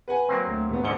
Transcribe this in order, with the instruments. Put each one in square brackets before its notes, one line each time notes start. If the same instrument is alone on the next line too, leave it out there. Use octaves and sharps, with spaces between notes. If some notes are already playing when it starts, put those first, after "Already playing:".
[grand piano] B4 F#5 G#5
[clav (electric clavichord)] F#3 A#3 C4
[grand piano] D2
D#2 A#2 B3
[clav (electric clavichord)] G#2 D3 [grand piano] F#5 C#7 G7